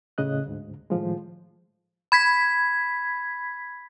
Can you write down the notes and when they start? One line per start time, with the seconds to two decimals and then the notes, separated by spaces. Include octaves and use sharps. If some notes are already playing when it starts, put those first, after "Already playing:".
0.18 A2 C#3 D#5 F#6
0.46 D2 G#2
0.90 A2 D#3 F3 G#3
2.12 B5 G#6 B6